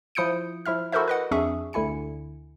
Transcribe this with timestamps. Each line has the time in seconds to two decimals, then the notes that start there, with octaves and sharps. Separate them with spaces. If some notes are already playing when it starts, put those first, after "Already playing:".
0.15 F3 E4 D#6 G6 C#7 D7
0.66 F3 E4 E5 F6
0.92 E4 F#4 A4 A#4 C5 E5
1.08 B4 D#5 F#5
1.31 F2 D4 G#4 E5 C#6 D#6
1.73 D2 D3 E4 G#5 C#7